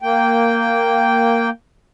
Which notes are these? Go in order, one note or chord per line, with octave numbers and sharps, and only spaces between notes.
A#3 G5